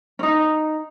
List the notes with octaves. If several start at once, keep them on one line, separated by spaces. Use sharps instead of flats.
C#4 D#4